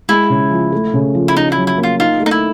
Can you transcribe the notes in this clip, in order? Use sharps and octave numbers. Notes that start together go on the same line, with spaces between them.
G#3 E4
C#3
F3
A3
C#3
F3
E4
C#4 D#4
F#3 E4
E4
A#3
F4
D#4 F4
A3
D#4
E4